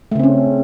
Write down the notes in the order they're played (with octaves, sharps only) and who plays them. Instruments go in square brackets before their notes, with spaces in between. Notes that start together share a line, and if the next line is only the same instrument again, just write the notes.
[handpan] A3
C#3
C4
C#4